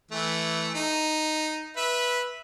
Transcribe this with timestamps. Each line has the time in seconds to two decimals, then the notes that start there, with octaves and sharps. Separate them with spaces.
0.11 E3 A3
0.75 D#4
1.77 B4 E5